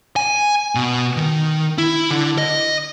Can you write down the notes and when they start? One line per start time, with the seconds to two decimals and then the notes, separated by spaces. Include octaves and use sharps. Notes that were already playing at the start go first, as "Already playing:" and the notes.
0.16 G#5
0.75 B2
1.17 D#3
1.78 E4
2.11 D3
2.38 D#5